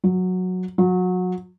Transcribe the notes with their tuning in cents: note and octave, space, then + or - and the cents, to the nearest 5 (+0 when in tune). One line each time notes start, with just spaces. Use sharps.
F#3 -10
F#3 -25